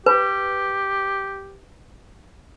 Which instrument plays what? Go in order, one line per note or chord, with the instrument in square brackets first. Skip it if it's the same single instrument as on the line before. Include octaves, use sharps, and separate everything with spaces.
[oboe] G4 [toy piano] B4